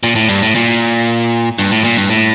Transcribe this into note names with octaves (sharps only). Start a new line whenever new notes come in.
A#2
A2
G2
A2
A#2
G2
A2
A#2
G2
A2